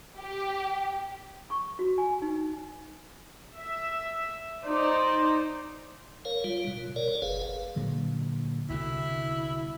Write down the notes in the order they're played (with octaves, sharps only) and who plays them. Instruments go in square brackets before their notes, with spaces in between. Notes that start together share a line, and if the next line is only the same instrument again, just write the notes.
[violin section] G4
[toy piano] C#6
F#4
G#5
D#4
[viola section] E5
D#4 C5 D5
[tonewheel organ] A#4 C#5 F5
G3 F4
B2
A#4 C#5 D5
F#1 G#4 B4 F5
[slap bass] A#2 D3 F#3
[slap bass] C2 B2 D3 [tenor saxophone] E4